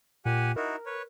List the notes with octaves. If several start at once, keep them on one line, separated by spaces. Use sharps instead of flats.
A#2 G4 F#5 G#5
D#4 E4 F#4 A#4
B4 C#5